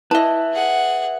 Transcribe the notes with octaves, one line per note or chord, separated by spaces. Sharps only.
E4 B4 D#5 E5 A5
G#4 F#5